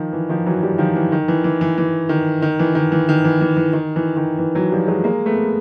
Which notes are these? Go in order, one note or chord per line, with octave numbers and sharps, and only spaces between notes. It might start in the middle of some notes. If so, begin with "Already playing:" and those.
Already playing: D#3 F3
E3
D#3 F3
E3 F#3
F3 G3
D#3 F3
E3
D#3
E3
E3
E3
E3
D#3
D#3
E3
D#3
E3
D#3
E3
E3
E3
D#3
E3
D#3
E3
E3 F#3
F3 G3
F#3 G#3
G#3 A#3
A3 B3